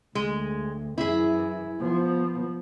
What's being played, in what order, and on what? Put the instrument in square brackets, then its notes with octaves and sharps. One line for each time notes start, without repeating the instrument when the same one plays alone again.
[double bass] D2 [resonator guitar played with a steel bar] G#3
[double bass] F#2 E3 [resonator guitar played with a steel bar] E4 G#4
[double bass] F3 B3